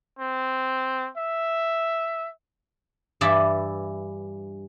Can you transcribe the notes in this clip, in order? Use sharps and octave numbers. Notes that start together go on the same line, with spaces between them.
C4
E5
G2 E3 E4 D5 E5